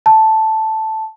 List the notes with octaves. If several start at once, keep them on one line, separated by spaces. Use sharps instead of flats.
A5